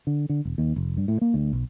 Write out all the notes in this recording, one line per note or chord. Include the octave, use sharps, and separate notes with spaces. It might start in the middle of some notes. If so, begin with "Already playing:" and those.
D3
D3
E1
D#2
F1
G2
A2
A#3
D2
B1